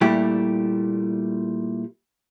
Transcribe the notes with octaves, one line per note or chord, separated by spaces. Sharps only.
A#2 G3 A3 E4 G4